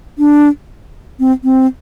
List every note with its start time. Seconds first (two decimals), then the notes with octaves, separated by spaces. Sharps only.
0.18 D4
1.20 C4
1.44 C4